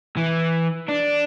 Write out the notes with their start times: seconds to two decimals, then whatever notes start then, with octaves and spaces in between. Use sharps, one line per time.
0.17 E3
0.88 D4